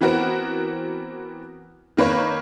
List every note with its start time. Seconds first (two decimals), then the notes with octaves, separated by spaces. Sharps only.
0.01 E3 B3 C4 F#4 A#4
1.97 D#3 A#3 B4 C#5